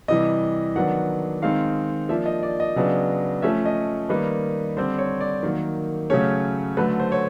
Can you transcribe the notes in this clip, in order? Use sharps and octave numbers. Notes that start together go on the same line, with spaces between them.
C3 E3 G3 D#5
D#3 F#3 B3 D4 F#5
D#3 G#3 C4 D#4 F5
F3 A#3 D4 E5
D#5
D5
D#5
C#3 F#3 B3 D4
F3 A3 C#4 E5
D#5
D#3 G3 A#3 D#4 B4
D3 G3 C4 C5
C#5
D5
D#3 F#3 A#3
C#3 F#3 A3 C#4 C#5
D3 F#3 A3 B4
C5
C#5